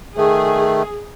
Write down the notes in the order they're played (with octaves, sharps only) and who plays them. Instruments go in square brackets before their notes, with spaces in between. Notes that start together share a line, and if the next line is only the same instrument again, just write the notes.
[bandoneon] D#3 A3 [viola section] G#4